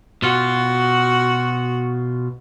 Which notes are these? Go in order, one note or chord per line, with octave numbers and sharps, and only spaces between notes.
B2 F4 F#4